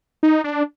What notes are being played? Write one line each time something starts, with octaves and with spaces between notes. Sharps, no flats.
D#4
D4